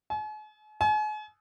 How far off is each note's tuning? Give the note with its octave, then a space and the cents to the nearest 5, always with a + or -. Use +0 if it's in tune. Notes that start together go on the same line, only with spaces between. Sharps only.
G#5 +45
G#5 +40